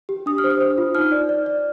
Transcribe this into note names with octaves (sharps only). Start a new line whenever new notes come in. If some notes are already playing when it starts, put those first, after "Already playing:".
G4
D4 D#6
F6
C5
D#6
C5
F4
D#4 F6
D5
D5
D5